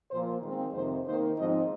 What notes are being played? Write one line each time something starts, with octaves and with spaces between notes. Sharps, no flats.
A#2 F3 A#3 C5
D#3 G#3 C4
F2 C3 D#3 C5
D#3 A#3 D#4 C5
G#2 F3 C4 D#4 D#5